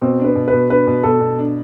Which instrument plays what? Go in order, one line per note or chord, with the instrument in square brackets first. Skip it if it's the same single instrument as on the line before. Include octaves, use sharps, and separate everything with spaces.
[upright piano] B2 [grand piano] C4
[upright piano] D4 [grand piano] B4
[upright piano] B2
[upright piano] B2 [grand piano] B4
[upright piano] D4 [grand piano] B4
[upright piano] B2
[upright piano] B2 [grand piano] A4
[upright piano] B2
D4